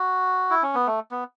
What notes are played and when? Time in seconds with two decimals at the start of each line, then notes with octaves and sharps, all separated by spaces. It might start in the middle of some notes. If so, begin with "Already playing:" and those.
Already playing: F#4
0.51 E4
0.62 C#4
0.75 B3
0.87 A3
1.11 B3